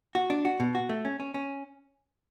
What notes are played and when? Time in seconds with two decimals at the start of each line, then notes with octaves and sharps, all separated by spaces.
0.15 F#4
0.30 D4
0.45 F#4
0.60 B2
0.75 F#4
0.89 A3
1.05 C#4
1.20 C#4
1.34 C#4